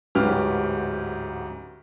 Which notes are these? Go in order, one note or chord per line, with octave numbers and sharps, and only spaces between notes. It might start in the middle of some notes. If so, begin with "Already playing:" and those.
D1 G#2 C#4 G4 B4 F6